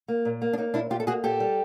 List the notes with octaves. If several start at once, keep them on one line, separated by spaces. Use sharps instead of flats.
A#3
A#2
A#3
D4
A#3 D#4
A#2 D4 E4
A#2 F4 G4
A4
A#3 F#4 G#4
A#2 G4 A4
G3